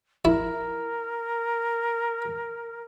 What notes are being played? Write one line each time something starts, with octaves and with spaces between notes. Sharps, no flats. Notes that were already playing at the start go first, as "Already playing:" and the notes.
E4 A#4